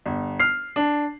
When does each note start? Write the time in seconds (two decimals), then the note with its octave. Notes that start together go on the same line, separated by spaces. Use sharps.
0.06 G1
0.40 F6 C7
0.76 D4